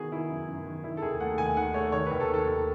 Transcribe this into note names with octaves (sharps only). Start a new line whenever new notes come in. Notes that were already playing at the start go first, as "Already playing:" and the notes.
Already playing: D#3 B3 F#4 G#4
D#3 E4
F#2
F#2
D#3
D#3 E4
A4
D#2 G#4
A3 F#5
D#2 G#5
D#3 F#5
A3 C#5
D#3 C#5
B4
D#2
A4
D#3
A4
D#2